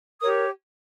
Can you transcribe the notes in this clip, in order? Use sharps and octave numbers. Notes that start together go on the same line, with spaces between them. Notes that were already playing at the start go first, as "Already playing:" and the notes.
G4 A#4 C#5 D#6